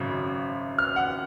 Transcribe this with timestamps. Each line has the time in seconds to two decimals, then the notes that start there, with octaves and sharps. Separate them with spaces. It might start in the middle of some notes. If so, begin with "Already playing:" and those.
Already playing: G#1 F#2 C#3
0.78 F6
0.96 F#5